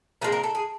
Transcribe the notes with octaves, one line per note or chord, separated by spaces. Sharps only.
A#2 F3 G#3 C4 A#4
A#4
A4
G#4